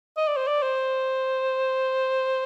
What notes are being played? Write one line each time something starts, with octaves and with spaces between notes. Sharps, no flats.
D#5
D5
C5
D5
C5